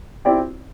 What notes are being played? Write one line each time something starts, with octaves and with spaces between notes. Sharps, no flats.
C4 E4 G4 D5